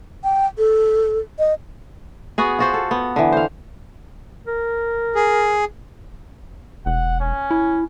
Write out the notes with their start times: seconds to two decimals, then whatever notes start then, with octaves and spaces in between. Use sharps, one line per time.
0.24 G5
0.58 A4
1.39 D#5
2.38 B3 F#4 G#4
2.59 F4 F#4 C5
2.74 A4
2.91 B3
3.16 D3 E3
3.32 C5 F5
4.46 A#4
5.16 G#4
6.86 E1 F#5
7.20 C#4
7.51 E4